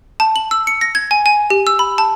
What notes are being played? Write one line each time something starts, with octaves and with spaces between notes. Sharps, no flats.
A5
F#7
E6
C#7
A#6
G#6
G#5
G#5
G4
E6
B5
A5